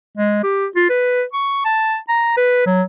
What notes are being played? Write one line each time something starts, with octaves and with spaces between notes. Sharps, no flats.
G#3
G4
F4
B4
C#6
A5
A#5
B4
F#3